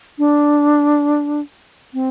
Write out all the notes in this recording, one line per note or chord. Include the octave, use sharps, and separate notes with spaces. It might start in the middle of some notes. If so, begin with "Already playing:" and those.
D4
C4